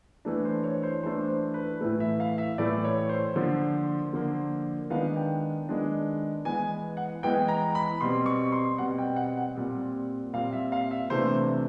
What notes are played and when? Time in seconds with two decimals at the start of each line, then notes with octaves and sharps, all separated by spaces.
0.25 E3 A3 D4
0.45 C5
0.64 C#5
0.83 C5
1.03 E3 A3 D4 C5
1.28 C5
1.54 B4
1.81 A2 E3 A3
2.00 E5
2.20 F5
2.38 E5
2.58 A2 E3 A3 D5
2.84 C#5
3.09 C5
3.35 D3 F3 A#3
4.13 D3 F3 A#3
4.90 D#3 G#3 B3 D4 F5
5.16 G5
5.69 D#3 G#3 B3 D4
6.45 E3 G#3 B3 G#5
6.97 F#5
7.23 E3 G#3 B3 G5
7.48 A#5
7.75 B5
8.01 B2 G3 C4 C6
8.26 C#6
8.52 C6
8.78 B2 G3 C4 F#5
8.98 G5
9.16 F#5
9.37 F#5
9.55 A#2 G3 C4
10.33 A#2 G3 C4 F5
10.53 E5
10.72 F5
10.91 E5
11.10 C3 E3 A3 D4 C5